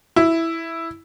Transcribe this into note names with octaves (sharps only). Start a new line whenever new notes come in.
E4